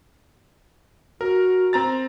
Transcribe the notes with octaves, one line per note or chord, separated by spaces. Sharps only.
F#4 A#4
C4 A#5 A6